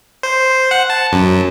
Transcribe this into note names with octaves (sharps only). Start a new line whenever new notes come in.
C5
F#5
A5
F#2